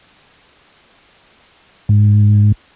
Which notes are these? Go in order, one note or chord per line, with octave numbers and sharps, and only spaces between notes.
G#2